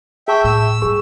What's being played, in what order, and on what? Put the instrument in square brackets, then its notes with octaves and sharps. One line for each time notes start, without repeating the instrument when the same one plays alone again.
[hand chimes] G#4 A5 C#6 [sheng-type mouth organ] E5 G5
[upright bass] A2 [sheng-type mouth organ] E6
[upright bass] G#2 G3 [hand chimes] G#4 C#6